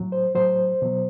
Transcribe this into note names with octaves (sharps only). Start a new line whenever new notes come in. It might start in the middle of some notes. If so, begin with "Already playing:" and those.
Already playing: A2 F#3
C5
A2 F#3 C5
B2 F#3